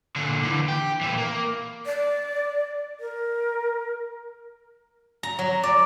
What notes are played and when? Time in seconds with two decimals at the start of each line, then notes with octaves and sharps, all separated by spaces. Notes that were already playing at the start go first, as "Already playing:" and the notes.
0.16 A#2 D3
0.43 D3 E3
0.68 G4
1.01 A#2 E3
1.17 A#3
1.86 D5
3.00 A#4
5.23 A#5
5.39 F#3
5.63 D5